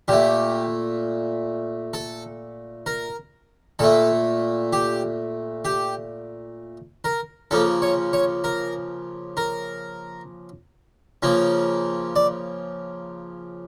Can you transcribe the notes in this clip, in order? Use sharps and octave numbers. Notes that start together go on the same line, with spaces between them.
A#2 A3 G4
A4
A#4
A#2 A3 A4
G4
G4
A#4
C#3 F3 A#3 A4
C#5
C#5
A#4
A#4
C#3 F3 A#3
D5